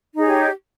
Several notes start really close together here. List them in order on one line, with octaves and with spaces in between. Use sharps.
D#4 G#4 C#5 G4